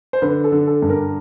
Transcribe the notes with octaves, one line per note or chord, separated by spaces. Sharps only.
C5
D3 B4
A4
D3
A4
G2
A#4